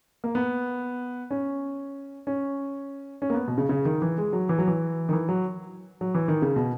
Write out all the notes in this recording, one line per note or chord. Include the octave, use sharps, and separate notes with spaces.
A#3
B3
C#4
C#4
C#4
A#3
B3
B2
C#3
C#3
D#3
E3
G#3
F#3
E3
F#3
E3
D#3
E3
F#3
F#3
E3
D#3
C#3
B2